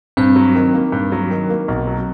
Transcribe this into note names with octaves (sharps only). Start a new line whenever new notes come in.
G2 C4
F#3
D#3
A#3
G2
F#3
D#3
A#3
B1
F#3